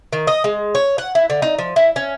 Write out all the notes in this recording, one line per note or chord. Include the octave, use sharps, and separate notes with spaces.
D#3
D#5
G#3
C#5
F#5
E4
D3
D#4
F3
E4
C#4